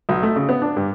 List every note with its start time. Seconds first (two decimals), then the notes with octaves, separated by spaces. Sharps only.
0.09 B1
0.23 A3
0.36 C#3
0.49 B3
0.62 D4
0.76 G2